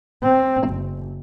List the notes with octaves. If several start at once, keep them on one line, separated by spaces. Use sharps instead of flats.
C4
F#1